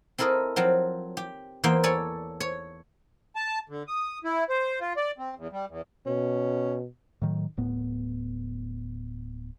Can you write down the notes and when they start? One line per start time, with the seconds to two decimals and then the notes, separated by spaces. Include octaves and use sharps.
0.18 C4 E4 A4 A#4 D#5
0.56 F3 F#3 C4
1.17 G4
1.64 E2 E3 A#3 C5 G5
1.83 A4 C#5 D5 G#5
2.40 C#5
3.36 A5
3.69 D3
3.88 D#6
4.24 E4
4.49 C5
4.81 F4
4.97 D5
5.18 C4
5.37 E2
5.52 G3
5.69 E2
6.06 B2 C#4
7.22 A2 D#3 F#3
7.57 D1 A2 B3